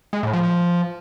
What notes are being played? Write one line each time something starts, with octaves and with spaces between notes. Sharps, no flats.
G#3
A2
F3